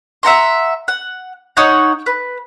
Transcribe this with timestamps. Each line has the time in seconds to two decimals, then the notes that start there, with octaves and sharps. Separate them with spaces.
0.23 E5 F#5 A#5 C6
0.88 F#5
1.57 D#4 C#5 F#5 A#5
2.06 B4